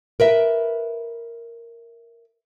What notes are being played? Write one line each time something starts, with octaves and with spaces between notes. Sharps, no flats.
A#4 B4 E5